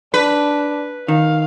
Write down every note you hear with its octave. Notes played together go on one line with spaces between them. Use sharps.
D4 B4
D#3 F5